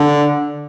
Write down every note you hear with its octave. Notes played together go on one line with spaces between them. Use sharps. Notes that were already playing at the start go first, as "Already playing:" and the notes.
Already playing: D3